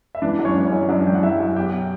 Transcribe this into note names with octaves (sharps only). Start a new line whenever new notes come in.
E5
E3 D4 D5
F#2
C#4 C#5
E3
C#4 C#5
F#2
F#2 D4 D5
E3 G5
F#5
F#2 E4 E5
F#2
F#5
B2 G4 G5